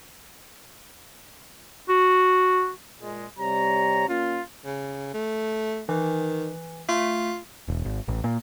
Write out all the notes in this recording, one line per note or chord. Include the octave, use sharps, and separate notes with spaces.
F#4
A#2 G#3
C3 G3 C#5 A#5
A#3 C#4 F4
C#3
A3
D#3 E3
A3 F4
E1
G#1
A1
A#2